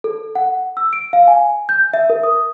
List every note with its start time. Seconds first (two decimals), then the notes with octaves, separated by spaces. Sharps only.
0.04 A4
0.35 F#5
0.77 E6
0.93 D7
1.13 F5
1.27 G#5
1.69 G6
1.94 E5
2.10 A#4
2.23 D#6